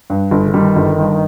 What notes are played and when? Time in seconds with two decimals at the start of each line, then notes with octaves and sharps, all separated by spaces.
0.10 G2
0.31 G1
0.43 C#3
0.53 D#3 G3
0.76 G1
0.98 G2